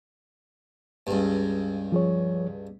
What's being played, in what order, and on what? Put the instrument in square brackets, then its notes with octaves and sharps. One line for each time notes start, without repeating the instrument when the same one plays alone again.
[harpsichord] C#2 G2
[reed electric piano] F3 G#4 C#5